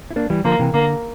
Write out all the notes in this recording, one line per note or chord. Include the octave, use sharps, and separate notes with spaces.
E4
A#3 D4
E3 G3
D3 F3 A#3
C3 E3
D3 A#3